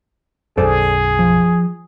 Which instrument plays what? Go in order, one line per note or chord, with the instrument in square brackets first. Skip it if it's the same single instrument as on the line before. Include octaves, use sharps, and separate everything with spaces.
[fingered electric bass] B1 F#2 [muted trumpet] G#4 [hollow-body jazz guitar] A4 C5 D5
[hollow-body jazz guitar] F3